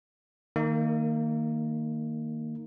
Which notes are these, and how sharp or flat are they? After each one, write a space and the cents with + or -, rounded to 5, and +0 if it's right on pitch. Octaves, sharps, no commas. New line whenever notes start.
D#3 +0 A#3 -25 D#4 +0